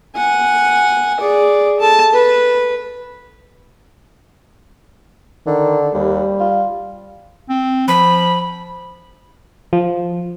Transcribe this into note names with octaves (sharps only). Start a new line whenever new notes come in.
F#5 G#5
G#4 D5
A4 A5
B4
D3 D#3
D#2 G3
F4
C4
F3 B5
F3